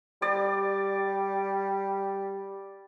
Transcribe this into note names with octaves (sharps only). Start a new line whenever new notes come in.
G3 D5